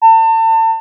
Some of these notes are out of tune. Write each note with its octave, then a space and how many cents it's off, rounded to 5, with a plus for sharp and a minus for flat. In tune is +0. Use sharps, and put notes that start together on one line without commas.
A5 +35